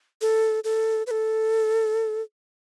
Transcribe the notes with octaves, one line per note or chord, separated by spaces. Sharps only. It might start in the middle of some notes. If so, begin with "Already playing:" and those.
A4
A4
B4
A4